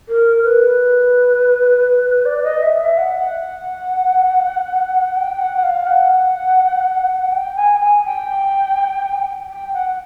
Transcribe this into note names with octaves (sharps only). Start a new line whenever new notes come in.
A#4
B4
D5
D#5
E5
E5
F#5
G5
F#5
F#5
F5
F#5
G5
G#5
G5
G#5
G5
G5
F#5